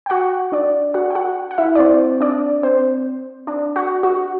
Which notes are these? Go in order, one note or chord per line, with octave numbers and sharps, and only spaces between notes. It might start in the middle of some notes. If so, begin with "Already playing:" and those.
G5
F#4 F#5
D4 D5
F#4 F#5
G5
F#4 F#5
F#5
E4 E5
D5
C4 C5
D4 D5
C4 C5
D4 D5
F#4 F#5
F#4 F#5